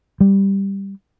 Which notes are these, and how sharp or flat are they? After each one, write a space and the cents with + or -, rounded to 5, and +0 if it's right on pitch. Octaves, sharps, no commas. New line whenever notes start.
G3 +5